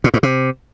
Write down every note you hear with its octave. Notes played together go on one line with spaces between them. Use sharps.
A#2
G#2
C3